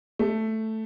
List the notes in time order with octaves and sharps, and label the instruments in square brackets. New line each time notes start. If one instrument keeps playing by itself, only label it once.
[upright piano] A3